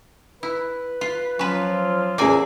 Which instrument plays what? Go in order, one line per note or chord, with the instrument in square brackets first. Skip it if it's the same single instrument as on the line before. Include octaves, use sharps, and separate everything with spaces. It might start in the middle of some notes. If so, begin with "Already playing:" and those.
[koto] E4 [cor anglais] B4
[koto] F4
[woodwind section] F3 F#3 [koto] C#4 B4 [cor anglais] F4
[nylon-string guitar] E2 G#4 [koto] A#3 D5 G#5 [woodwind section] C#4 E5